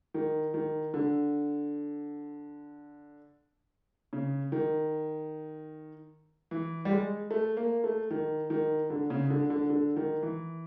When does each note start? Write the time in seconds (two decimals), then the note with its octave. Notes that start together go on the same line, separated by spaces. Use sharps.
0.14 D#3
0.54 D#3
0.94 D3
4.13 C#3
4.52 D#3
6.51 E3
6.85 G3
6.91 G#3
7.31 A3
7.57 A#3
7.84 A3
8.11 D#3
8.50 D#3
8.90 D3
9.10 C#3
9.30 D3
9.50 D3
9.70 D3
9.96 D#3
10.23 E3